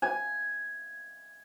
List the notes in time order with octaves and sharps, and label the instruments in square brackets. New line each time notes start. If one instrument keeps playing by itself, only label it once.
[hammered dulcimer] G#5